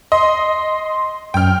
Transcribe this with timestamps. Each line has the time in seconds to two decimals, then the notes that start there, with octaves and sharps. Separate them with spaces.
0.12 D#5 C6
1.34 F#2 G5 F6